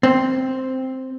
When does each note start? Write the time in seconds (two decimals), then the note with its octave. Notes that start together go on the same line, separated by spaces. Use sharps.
0.03 C4